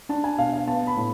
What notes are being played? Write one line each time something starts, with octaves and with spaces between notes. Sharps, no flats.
D4 A5
G#5
B2 F5
F5
B3 A5
B5
A2